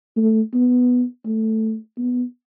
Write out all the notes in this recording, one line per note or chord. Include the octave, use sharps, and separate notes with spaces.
A3
B3
A3
B3